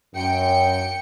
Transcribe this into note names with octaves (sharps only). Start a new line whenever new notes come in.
F#2 G5 C#7